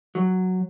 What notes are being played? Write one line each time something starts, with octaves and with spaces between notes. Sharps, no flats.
F#3